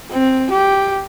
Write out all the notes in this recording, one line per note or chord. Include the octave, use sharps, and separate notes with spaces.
C4
G4